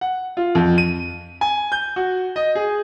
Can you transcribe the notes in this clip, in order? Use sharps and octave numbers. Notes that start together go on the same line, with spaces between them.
F#5
F4
F2
D#7
G#5
G6
F#4
D#5
G#4